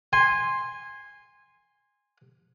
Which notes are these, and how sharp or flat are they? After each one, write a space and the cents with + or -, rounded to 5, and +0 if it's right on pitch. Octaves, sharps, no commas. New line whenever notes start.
G#5 -15 C6 +5